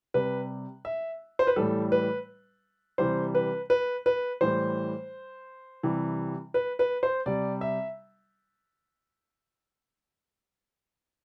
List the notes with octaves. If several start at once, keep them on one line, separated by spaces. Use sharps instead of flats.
C3 G3 B4
E5
C5
B4
A2 E3 G3 A4
B4
C3 E3 G3 C5
B4
B4
B4
A2 E3 G3 C5
C3 E3 G3
B4
B4
C5
C3 G3 D5
E5